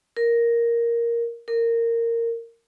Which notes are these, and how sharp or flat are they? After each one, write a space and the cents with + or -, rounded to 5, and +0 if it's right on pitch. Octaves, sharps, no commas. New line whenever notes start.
A#4 +5
A#4 -15